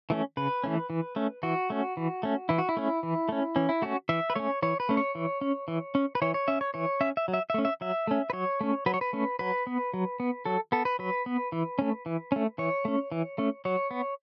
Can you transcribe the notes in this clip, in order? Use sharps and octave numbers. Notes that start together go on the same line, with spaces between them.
E3 A3 C#4
C#3 B4
E3 A3 C#4
E3
A3 C#4
E3 F#4
A3 C#4
E3
A3 C#4
E3 E4
F#4
E4
A3 C#4
E3
A3 C#4
E3 C#4
E4
A3 C#4 F#4
E3 E5
B4
A3 C#4 C#5
E3 C#5
B4
A3 C#4
C#5
E3
C#4
E3
C#4
B4
E3 C#5
C#5
C#4 E5
C#5
E3 C#5
C#4 E5
E5
F#3
E5
E5
A3 C#4
E5
F#3 E5
A3 C#4
B4
F#3 C#5
A3 C#4
F#3 B4
C#5
B4
A3 C#4
F#3 B4
B3
F#3
B3
F#3 A4
B3 A4
B4
F#3 B4
B3
E3
A3 C#4
E3
A3 C#4
E3 C#5
A3 C#4
E3
A3 C#4
F#3 C#5
B3